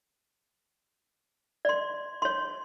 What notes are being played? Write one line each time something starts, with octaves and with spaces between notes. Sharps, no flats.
D5 C6
C#5 C6